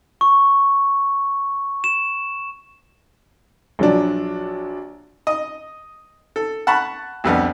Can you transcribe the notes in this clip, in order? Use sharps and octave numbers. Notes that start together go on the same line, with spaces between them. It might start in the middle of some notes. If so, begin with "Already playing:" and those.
C#6
E7
A#1 F#3 D4
D#5
A4
F#5 A5 B5 C#6
C2 F2 B3 D4